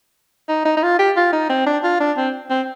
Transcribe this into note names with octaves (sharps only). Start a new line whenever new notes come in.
D#4
D#4
D#4
F4
G4
F4
D#4
C4
D4
F4
D4
C4
C4